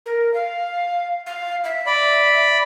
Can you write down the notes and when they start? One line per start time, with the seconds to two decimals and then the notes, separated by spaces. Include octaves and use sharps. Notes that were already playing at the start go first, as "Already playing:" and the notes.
0.06 A#4
0.34 F5
1.26 F5
1.64 E5
1.86 D5 B5